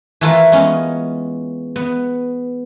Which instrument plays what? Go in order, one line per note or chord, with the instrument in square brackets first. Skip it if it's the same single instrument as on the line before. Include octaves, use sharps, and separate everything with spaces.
[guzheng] E3 A3 E4 F4 A#4 B4
G#3 B3 C#4
B3